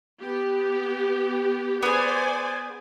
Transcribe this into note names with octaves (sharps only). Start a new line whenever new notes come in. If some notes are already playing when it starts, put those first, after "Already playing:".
B3 G4
B3 G#4 C5 D5 G#5